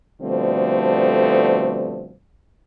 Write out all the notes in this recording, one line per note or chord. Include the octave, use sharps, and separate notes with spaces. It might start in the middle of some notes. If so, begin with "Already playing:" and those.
B2 D3 F3 G3 A3 C4